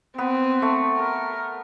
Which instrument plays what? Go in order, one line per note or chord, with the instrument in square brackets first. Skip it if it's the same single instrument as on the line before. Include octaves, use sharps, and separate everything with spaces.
[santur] B3 [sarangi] C4
[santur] A3
[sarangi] A#4